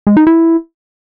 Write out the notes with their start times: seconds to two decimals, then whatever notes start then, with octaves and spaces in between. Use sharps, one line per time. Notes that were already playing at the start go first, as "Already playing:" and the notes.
0.07 G#3
0.17 D#4
0.27 E4